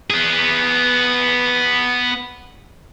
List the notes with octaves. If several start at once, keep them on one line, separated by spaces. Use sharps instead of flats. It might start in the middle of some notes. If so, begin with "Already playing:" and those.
B3 G#4